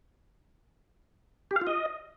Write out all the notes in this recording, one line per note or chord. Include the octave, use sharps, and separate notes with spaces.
G4
F5
F4
D#5